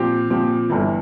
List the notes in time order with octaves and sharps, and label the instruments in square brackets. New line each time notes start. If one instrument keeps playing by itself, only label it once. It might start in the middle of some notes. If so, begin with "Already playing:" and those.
Already playing: [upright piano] A#2 F3 C4 G4
A#2 F3 C4 G4
G1 G2 E3